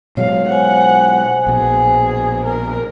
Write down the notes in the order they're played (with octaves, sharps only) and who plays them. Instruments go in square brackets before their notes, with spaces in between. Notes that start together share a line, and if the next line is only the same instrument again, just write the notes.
[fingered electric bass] B2 F#3 G#3 [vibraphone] C#5 [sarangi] F5
[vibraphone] C5 G#5 [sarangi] F#5
[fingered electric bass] A#1 B2 [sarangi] G#4
[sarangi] A#4